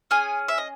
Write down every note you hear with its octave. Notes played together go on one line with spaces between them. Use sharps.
C#4 G#4 G#5
E5
D#5